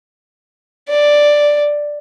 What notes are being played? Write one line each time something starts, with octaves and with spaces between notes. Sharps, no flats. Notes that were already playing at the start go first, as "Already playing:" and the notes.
D5